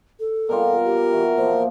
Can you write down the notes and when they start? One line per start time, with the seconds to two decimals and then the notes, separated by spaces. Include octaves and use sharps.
0.20 A4
0.49 B2 G3 F4 A#4
0.85 G4
1.13 E3 F#4
1.37 A#2 F3 C5